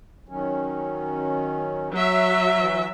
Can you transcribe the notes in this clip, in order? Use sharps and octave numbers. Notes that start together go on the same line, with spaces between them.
D#3 F#3 C#4
F#3 E5
E3